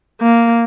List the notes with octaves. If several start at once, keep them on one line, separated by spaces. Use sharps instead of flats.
A#3